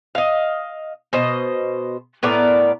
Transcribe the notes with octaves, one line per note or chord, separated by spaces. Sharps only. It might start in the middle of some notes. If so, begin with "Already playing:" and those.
D#5 F5
B2 C5 D#5
A2 B3 A#4 D5